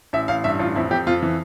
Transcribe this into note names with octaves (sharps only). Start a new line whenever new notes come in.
A1 E5
A1 F5
G2 E5
A1 F4
F2 E4
F2 G4
F2 F4
E3